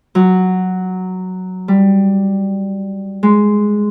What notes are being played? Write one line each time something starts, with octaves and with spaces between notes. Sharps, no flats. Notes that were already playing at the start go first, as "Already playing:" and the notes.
F#3
G3
G#3